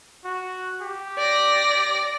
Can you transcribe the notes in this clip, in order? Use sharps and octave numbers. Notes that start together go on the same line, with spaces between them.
F#4
G4
D5 A#6